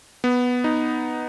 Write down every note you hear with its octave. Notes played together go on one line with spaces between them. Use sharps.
B3
D#4